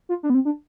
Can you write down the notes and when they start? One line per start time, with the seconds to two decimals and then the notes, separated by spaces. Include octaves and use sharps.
0.09 F4
0.23 D4
0.30 B3
0.35 C4
0.45 D4